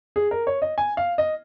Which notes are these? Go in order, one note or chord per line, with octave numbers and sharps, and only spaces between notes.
G#4
A#4
C#5
D#5
G#5
F5
D#5